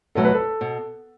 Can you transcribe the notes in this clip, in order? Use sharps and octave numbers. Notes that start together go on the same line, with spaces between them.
E2 B2 F#3 A3 A4
B4
A4
B2